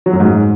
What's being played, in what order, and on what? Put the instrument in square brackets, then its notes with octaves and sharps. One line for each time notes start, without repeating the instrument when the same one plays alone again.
[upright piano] F#3
F#2
G#2